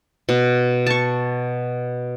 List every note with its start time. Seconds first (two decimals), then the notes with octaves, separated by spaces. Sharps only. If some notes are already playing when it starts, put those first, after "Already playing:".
0.29 B2
0.86 A5 C#6